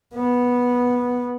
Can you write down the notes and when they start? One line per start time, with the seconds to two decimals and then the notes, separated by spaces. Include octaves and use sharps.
0.15 B3